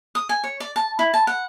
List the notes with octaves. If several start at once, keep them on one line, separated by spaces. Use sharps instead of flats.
D#6
G#5
C#5
D5
A5
E4
A5
F#5